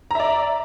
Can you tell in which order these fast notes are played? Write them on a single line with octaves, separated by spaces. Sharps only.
A#5 E5 D5